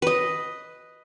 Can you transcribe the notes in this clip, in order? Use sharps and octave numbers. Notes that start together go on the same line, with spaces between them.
B4 D#5